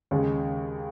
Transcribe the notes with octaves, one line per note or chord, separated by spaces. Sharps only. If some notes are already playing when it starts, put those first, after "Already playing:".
D#2 C#3 G#3